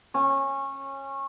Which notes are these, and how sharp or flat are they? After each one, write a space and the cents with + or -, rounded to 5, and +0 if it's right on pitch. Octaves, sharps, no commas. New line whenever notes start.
C#4 -20